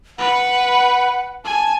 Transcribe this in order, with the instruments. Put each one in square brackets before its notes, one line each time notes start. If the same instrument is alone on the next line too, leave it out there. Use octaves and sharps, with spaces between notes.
[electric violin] B4 [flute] F#5
[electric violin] G#5 [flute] A5